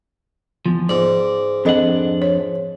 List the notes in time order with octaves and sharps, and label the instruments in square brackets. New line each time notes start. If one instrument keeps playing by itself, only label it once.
[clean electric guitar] E2 F3
[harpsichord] G#2 [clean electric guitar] D5
[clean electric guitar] F2 D4 F#5 [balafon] C4 A4 D#5
[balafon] C#5